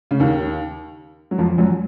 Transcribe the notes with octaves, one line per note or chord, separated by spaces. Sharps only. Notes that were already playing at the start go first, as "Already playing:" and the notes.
C#3
D#2 D#3
F#3
F2 F3
F#2 F#3